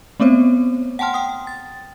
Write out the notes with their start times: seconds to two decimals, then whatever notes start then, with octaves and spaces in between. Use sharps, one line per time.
0.20 A3 B3 C4 C5 C#5
0.99 F#5 G5 A5 C6 F6
1.14 G5 D#6
1.47 A6